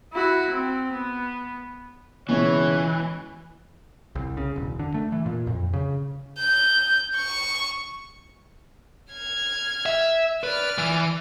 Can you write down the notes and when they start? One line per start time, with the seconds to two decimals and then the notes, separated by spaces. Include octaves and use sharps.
0.12 E4 F#4
0.50 C4
0.93 B3
2.29 C#2 B2 E3 C#5
4.15 C2
4.37 C#3
4.56 E1
4.79 D3
4.94 A3
5.12 E3
5.26 A#2
5.47 F2
5.73 C#3
6.39 G6
7.16 C#6
9.12 F6 G#6
9.86 E5
10.43 B4 D5 F6
10.78 E3